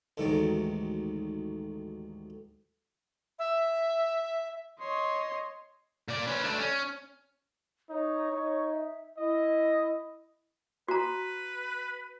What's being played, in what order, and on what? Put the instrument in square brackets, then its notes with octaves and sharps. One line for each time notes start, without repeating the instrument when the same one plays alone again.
[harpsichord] A1 D2 G#2 D#3 F#3 D5
[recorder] E5
[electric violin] C#5 D#5 [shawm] C6
[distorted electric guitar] A#2 D5
C#4 B4
A3 D4
C#4
[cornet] D#4 [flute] C#5
[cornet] D#4
[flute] E5
[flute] E4 [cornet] D#5
[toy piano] F#4 A#5 [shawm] B4